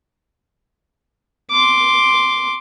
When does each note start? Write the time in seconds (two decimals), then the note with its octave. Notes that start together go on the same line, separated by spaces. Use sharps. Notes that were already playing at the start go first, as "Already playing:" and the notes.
1.51 C6 D6